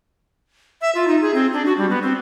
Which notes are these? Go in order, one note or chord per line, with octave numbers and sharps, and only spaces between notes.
E5
F4
D#4
G#4
C4
D4
F#4
G3
B3
C4